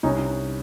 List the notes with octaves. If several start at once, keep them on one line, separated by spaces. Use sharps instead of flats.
C2 C#4 D#4